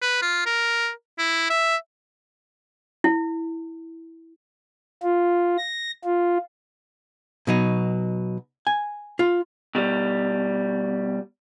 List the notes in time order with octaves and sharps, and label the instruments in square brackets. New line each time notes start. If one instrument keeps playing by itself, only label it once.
[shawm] B4
F4
A#4
E4
E5
[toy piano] E4
[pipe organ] F4
A#6
F4
[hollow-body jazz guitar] B2 F#3 D#4
G#5
F4
[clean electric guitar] B2 G3